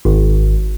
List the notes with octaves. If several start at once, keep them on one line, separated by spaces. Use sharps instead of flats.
G#1